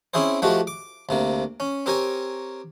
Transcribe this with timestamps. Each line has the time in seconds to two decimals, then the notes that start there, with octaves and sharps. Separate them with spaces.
0.14 C4 C#4 E4 G#4 C5
0.42 F3 G#3 A3 F#4 G4
0.67 D6
1.09 D2 C3 A#3
1.60 C#4
1.86 C4 G4 A#4 C#5 G#5